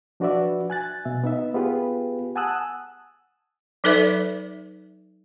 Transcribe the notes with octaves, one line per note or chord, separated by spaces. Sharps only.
F3 D4 F#4 B4 D5 E5
G#5 F#6 A6
B2 E5
B3 D#4 E5
B3 F4 G4 G#4 B4
F#5 G#5 A5 D#6 E6 F#6
F#3 D#4 A4 B4 D5 E5